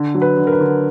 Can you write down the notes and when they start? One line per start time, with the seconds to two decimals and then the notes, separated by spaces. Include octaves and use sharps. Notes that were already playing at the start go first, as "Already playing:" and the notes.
Already playing: D3
0.15 F#3
0.22 B4
0.37 D3
0.47 A#4
0.53 B4
0.60 D3